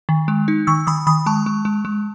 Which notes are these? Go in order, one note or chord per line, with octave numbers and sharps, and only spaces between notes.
D#3
G#3
D#4
D#3 C#6 E6
D#3 B5 D#6
D#3 B5 D#6
G#3 A5 C#6
G#3
G#3
G#3